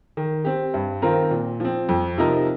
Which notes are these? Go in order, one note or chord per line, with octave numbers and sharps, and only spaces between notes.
D#3
C4 G4
G2
D#3 C4 F4 A#4
A#2
F3 C4
F2
C3 F3 D#4 A#4